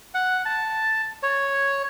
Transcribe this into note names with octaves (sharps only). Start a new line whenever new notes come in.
F#5
A5
C#5